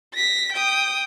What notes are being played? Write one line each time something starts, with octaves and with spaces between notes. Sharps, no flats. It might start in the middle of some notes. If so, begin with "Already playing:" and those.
A#6 B6
G5 D#6